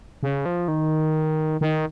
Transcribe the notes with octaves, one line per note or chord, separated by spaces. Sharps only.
C#3
F3
D#3
D#3